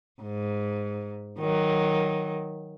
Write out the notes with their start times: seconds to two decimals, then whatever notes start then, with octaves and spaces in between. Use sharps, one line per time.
0.22 G#2
1.39 D#3 F#3